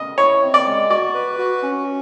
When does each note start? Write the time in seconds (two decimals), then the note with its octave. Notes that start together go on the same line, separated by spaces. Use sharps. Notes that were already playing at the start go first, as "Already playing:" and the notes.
Already playing: D#5
0.18 E4 C#5
0.42 C4
0.54 D5
0.66 G#3
0.90 F#4 D5
1.14 B4
1.39 F#4
1.63 C#4